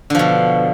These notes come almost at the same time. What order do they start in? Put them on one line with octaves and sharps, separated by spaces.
D3 F3 B2